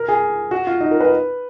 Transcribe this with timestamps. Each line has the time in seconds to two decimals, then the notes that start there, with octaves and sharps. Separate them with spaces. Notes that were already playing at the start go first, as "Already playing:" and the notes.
Already playing: A#4
0.08 G#4
0.51 F#4
0.67 F4
0.81 D#4
0.91 A#4
1.01 B4